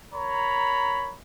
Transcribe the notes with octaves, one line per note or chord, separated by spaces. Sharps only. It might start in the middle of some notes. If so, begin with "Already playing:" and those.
A#4 C#5 A#5 B5